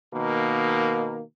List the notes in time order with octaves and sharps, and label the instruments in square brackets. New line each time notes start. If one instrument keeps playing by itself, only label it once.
[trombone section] B2 D#3 A#3